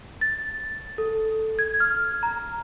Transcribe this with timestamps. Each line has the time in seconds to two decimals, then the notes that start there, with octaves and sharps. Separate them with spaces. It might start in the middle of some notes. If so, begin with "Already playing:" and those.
0.21 A6
0.98 A4
1.59 G#6
1.80 F6
2.23 A#5